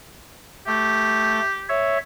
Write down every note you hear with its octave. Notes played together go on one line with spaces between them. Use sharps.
A3 G4
C#5 E5